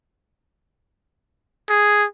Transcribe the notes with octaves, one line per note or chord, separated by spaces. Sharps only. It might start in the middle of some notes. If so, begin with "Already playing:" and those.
G#4